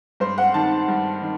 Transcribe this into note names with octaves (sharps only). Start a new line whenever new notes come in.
G2 C5
F#5
D#3 A5
G2
D#3